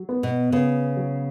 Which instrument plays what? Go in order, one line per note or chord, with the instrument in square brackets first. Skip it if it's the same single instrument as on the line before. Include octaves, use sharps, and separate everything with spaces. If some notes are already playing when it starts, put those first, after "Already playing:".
Already playing: [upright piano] F#3
B3
[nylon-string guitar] B2
[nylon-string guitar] C#3 [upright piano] B3
[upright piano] F#3